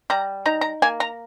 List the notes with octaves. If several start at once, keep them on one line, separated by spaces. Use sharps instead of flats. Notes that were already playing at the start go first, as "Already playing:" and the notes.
G3 A#5
D#4 A#5
A#5
A#3 G#5
A#5